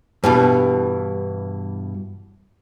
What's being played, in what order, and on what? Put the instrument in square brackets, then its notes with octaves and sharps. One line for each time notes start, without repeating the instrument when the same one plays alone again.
[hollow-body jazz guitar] G2 B2 E3